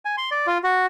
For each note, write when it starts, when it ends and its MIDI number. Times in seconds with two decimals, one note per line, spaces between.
0.05 0.16 80
0.17 0.30 84
0.31 0.46 74
0.47 0.58 65
0.64 0.86 66